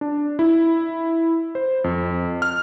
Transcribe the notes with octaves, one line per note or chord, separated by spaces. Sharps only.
D4
E4
C5
F2
F6